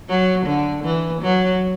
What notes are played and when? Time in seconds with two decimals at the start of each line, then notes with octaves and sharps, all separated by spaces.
0.09 F#3
0.46 D3
0.84 E3
1.22 F#3